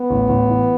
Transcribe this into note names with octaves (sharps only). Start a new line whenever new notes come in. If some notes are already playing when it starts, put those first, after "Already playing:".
Already playing: B3
A1
A1
E3